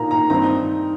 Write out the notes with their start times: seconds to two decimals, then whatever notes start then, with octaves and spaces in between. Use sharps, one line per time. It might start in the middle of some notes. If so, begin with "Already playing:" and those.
Already playing: A#2 A#3 D#4 A#5
0.11 A#5
0.30 G2 D#3 C4 D#4 A#5